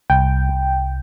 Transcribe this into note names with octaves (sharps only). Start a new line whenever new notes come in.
C2 G5
C2